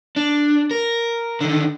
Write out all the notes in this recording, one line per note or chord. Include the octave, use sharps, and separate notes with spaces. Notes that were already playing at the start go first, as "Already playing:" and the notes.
D4
A#4
D3 D#3